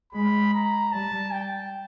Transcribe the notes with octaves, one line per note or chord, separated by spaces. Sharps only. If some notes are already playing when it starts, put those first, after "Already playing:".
G#3 B5
A#5
G3 A5
G5